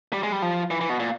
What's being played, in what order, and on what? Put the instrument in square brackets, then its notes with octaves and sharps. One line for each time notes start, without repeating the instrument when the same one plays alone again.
[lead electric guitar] G3
G#3
G3
F3
E3
E3
B2
A#2